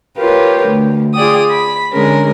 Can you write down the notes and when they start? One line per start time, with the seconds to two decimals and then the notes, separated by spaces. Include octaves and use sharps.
0.17 F4 G4 A#4 B4 C#5
0.68 D2
1.15 F4 G#4 D5 G5 D#6
1.50 B5
1.93 D3 G#3 C#4 A#4